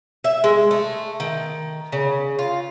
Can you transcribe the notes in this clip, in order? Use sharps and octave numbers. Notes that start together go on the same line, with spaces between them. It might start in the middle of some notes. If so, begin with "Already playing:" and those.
E5
G#3
A3
D#3
C#3
F4